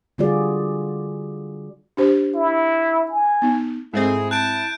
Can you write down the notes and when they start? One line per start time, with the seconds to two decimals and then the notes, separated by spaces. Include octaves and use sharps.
0.18 D3 G3 F4 F#4 G#4 D5
1.97 D4 G4 C5
2.35 E4
3.11 G#5
3.42 B3 D#4
3.94 G#2 A3 C4 E4 G#4
4.31 A5 F#6 G6 D7